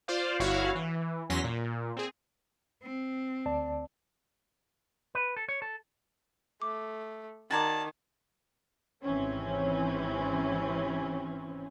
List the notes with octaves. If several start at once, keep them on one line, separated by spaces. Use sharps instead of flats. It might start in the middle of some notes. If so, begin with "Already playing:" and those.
F4 C5 D5 F5
G1 E4 F#4 C#5 F5
E3
E2 F#3 C#4 C6 A#6 B6
A#2
C4 G#4
C4
D2 D5 A5
B4
A4
C#5
A4
A3 D6
D#3 F#4 A#4 D5 A5 G#6 A6
G#1 C3 E3 C4 C#4